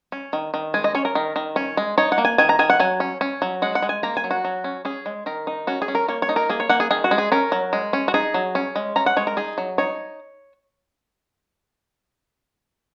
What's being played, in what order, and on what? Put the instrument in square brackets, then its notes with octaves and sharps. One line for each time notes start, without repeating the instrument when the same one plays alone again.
[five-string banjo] C#4
D#3
D#3
G#3 G#5
D#5
C#4 C#5
A#4
D#3
D#3
C#4
G#3
D#4 C#5
F#5
A#3
G#5
D#3 G#5
A#5
D#3 G#5
F#5
F#3 G#5
C#4
C#4
F#3
G#3 F#5
F#5
G#3
G#5
A#3 A#5
G#5
F#3
F#4
F#3
C#4
C#4 G#4
G#3
D#3 A#4
D#4
C#4 F#4
G#4
C#4
A#4
A#3 C#5
C#5
D#4
A#4
A#3 G#4
C#5
A#3 F#5
G#4
D#3 G#4
F#4
G#3
G#4
C#4 A#4
F#3
G#3
C#4
F#4
D#4 G#4
F#3
C#4
G#3
C#4 A#5
F#5
G#3 C#5
A#4
D#4 G#4
F#3
D#4 C#5